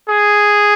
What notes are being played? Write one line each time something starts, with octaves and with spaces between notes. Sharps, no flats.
G#4